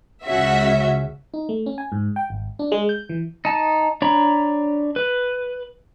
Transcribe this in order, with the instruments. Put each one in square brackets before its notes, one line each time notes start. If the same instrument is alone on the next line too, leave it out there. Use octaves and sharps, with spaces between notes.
[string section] C#2 C#3 C#4 F#4 E5
[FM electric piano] D#4
A3
C#4
G#5
G#2
G5
G#1
D4
G#3
G6
E3
[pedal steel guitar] D#4 A5
D4 C#5 A#5 B5
B4